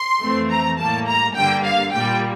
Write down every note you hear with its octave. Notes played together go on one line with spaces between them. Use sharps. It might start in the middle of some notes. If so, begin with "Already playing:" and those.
Already playing: C6
F2 E3 A3 C4
A#5
A2 G3 A#3 A5
A#5
G2 D3 G3 A#3 G5
F5
A#2 G3 A#3 G5